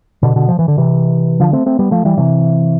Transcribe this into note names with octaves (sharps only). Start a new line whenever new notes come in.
B2 D3
B2 D3
F3
E3
D3
C3 E3
D3 F3
A3 C4
A3 C4
G3 B3
F3 A3
E3 G3
C3 E3